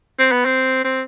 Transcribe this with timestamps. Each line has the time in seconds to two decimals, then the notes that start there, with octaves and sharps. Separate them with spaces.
0.19 C4
0.32 B3
0.45 C4
0.84 C4